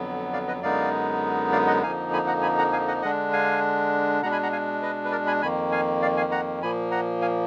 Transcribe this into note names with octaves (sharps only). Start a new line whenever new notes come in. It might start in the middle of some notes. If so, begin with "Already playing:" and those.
Already playing: F2 D3 F#3 B3
D5 F5
B4 D#5
F#2 D3 G#3 B3 D#4 D5 F5
D5 F5
D#5 F#5
F2 D3 F3 A#3 D#4 F5 G#5
G#5 B5
F#5 A#5
G#5 B5
F#5 A#5
F5 G#5
D#5 F#5
D3 G#3 D4 D#5 F#5
F5 G#5
B2 G#3 D4 F#5 A#5
G#5 B5
F#5 A#5
F5 G#5
B4 D#5
B4
A#4 D5
G#5 B5
F2 D#3 A#3 G#5 B5
F5 G#5
D5 F5
F5 G#5
F#5 A#5
A#2 F3 A#3 G#5 B5
F#5 A#5
F5 G#5